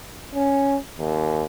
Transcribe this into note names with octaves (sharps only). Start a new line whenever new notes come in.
C#4
D#2